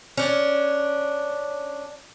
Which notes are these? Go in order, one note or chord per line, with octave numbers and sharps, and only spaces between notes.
C#4 D4